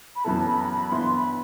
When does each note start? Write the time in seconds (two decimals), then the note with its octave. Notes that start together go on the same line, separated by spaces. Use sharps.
0.16 B5
0.24 F#2 E3 B3 E4 A4 A5
0.47 B5
0.62 A5
0.69 B5
0.92 G2 E3 B3 E4 C6
1.14 B5